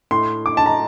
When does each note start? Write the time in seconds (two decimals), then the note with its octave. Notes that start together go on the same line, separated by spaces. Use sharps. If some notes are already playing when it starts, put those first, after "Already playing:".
0.11 A2 C6
0.46 D6
0.57 A5
0.66 A#5